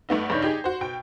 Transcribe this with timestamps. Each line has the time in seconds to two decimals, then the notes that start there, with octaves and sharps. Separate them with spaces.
0.09 G2 A3 B3 D#4
0.30 G2 C#3 D4 D#4 C#5 G6
0.42 D#4 G4 G#4
0.64 F#4 C5
0.81 B2 G5